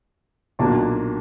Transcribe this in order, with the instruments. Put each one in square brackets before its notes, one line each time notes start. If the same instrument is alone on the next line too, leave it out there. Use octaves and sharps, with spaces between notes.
[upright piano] B1 A#2 A#3 D4 F#4